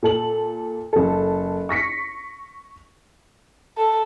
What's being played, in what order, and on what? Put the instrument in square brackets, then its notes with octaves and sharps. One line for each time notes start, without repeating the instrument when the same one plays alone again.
[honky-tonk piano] A#2 A4 F#7
F#1 A4
C#6 A#6 B6 C#7
[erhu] A4